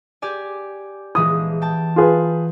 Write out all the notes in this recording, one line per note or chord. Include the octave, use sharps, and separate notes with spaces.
G4 D5 G#5
A#1 E3 G#3 D#6
G5 A5
F4 G#4 B4